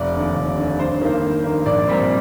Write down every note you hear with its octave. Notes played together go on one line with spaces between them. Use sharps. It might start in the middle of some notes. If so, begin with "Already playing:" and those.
Already playing: F1 D5
D#2 D3
F1
D#2 D3
G2 C5
D#3 A#3
G2
D#3 A#3
A#1 D5
A#2 G3 C4